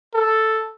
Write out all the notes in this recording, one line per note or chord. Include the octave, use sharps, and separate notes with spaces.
A4